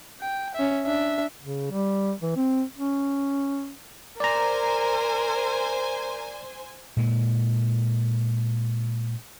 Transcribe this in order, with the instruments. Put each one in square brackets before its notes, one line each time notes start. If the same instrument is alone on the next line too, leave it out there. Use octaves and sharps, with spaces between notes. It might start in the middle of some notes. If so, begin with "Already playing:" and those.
[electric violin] G5
C#4 E5
D4 E5
[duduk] C#3
G3
E3
C4
C#4
[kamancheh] A#4 [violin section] C5 G#5 [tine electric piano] D5 A#5
[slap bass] A#2 G#3